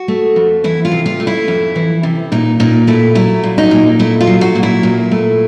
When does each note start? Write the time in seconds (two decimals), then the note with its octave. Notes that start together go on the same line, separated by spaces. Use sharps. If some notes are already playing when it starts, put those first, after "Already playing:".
Already playing: F#4
0.08 A3
0.36 F2
0.64 E3 E4
0.85 F4
0.92 C3
1.06 F4
1.20 A3
1.27 E4
1.48 F2
1.76 E3
2.03 C3
2.32 A#2 D#4
2.60 A#2 D#4
2.87 A3 E4
3.15 F#3 E4
3.44 A#2
3.58 D#4
3.71 A#2
3.99 A3 E4
4.20 F4
4.27 F#3
4.41 F#4
4.55 A#2
4.63 E4
4.83 A#2
5.11 A3